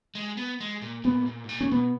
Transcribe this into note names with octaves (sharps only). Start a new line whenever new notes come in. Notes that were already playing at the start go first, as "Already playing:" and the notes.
G#3
B3
G#3
A#2
A#2 B3
G#2
A#2
G#2
A#2
C#4
B2 B3